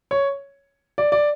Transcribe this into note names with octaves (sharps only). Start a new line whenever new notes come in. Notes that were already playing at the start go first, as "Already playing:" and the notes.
C#5
D5
D5